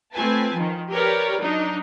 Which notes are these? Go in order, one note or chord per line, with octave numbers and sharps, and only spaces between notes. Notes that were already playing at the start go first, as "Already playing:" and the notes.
A3 C4 F4 B4 G#5 A5
D#3 F3
G4 A#4 B4 C#5 D5
F#3 D4 D#4